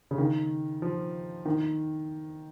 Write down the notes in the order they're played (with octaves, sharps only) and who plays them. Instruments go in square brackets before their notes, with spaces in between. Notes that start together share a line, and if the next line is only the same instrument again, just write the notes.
[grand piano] C#3
D#3
F3
D#3